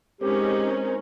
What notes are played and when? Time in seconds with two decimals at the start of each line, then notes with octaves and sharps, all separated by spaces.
0.21 G#3 C4 C#4 D#4 G4 A#4 C5